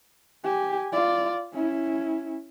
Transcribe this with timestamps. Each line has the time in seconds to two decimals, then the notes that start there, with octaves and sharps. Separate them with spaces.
0.44 G4 G#5
0.92 F4 D5
1.53 C#4 E4